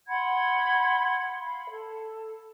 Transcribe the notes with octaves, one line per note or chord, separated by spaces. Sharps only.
F#5 B5 C6 G#6
F5 B5
A4